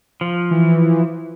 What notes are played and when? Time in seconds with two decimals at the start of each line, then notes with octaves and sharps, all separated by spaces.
0.21 F3
0.51 E3